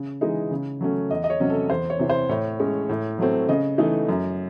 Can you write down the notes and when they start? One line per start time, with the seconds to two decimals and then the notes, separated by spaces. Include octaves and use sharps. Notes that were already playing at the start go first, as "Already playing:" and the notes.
Already playing: C#3
0.21 E3 G#3 D#4
0.51 C#3
0.81 F#3 A3 C#4
1.10 E2 D#5
1.24 D#5
1.30 C#5
1.40 C3 F#3 C#4
1.50 A4
1.70 E2 C5
1.90 C#5
1.99 C3 E3
2.10 C5
2.29 A2 C#5
2.59 G#3 C#4
2.89 A2
3.19 F#3 A3 C4
3.49 C#3 D#5
3.78 E3 A3 D#4
4.09 F#2